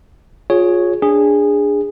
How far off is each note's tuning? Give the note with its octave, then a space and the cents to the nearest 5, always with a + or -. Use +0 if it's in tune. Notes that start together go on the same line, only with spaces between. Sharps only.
F4 +30 G#4 +0 C#5 +0
D4 +0 G#4 -20